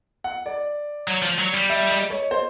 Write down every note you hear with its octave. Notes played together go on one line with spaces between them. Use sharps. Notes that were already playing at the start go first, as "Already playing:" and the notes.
F#5
D5
F#3
F3
F#3
G3
E5
D#5
C#5
C5